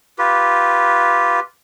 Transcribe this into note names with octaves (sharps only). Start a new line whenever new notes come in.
F4 G4 B4